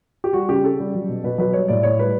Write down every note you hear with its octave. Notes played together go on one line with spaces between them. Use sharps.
G4
G3 F#4
C#3 G4
C#3 A4
G3
F#3
B2
B2 B4
F#3 B4
G3 C#5
A2 D5
A2 C#5
G3 B4